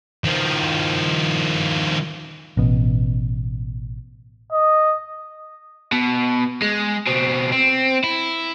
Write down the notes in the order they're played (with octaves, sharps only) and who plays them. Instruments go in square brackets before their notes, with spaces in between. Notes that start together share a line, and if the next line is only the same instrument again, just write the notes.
[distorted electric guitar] D#3 F3
[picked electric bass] A1 B2
[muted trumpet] D#5
[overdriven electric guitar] B2
G#3
B2 C4
C4
E4